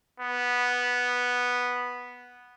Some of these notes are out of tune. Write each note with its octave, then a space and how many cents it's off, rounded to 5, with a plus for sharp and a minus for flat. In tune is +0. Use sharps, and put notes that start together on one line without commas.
B3 -5